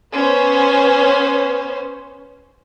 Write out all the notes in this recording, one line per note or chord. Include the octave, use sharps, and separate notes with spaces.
B3 C#4 C5